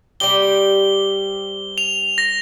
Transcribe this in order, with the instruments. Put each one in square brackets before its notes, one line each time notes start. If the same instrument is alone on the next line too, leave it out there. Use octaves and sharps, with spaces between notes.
[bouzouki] G3 C4 G4 [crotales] G7
[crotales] F7
A#6